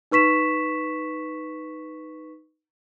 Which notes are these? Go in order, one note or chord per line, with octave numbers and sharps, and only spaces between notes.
D#4 B4 C#6 B6 E7